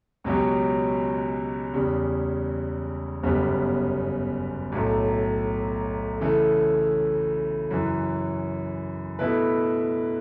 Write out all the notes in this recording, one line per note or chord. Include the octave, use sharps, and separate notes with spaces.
C#2 B2 F#3 C#4 G4
E2 C#3 G3
G1 F#2 C#3 G3 B3
B1 A2 F#3 A3
C#3 E3 A3
F#2 C#3 E3
B2 A3 E4 B4